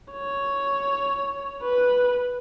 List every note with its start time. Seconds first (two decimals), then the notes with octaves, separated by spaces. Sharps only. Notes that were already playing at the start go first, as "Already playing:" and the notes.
0.12 C#5
1.63 B4